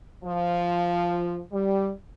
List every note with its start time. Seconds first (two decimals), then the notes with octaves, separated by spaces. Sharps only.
0.25 F3
1.52 G3